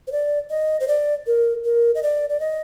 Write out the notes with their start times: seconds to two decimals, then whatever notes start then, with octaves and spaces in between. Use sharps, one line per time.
0.07 C5
0.12 D5
0.50 D#5
0.80 C5
0.88 D5
1.27 A#4
1.65 A#4
1.95 D#5
2.03 D5
2.29 D5
2.40 D#5